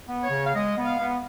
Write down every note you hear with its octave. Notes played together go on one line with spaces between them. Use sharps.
B3
C#5
C#3
F5
G#3 D#5
B3
F5
B3